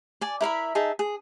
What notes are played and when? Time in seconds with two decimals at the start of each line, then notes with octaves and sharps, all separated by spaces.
0.21 D5 G#5
0.41 E4 A#4 E5 B5
0.75 D#4 G#4 E5 A5
0.99 G#4